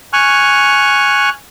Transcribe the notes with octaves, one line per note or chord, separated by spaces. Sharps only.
G#5 C#6 F6 F#6